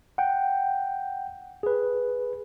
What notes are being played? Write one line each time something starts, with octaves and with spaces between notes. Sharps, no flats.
F#5 G5
G#4 B4